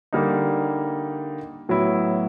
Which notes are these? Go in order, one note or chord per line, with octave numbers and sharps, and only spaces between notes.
D3 G3 A#3 D#4
A2 F#3 B3 E4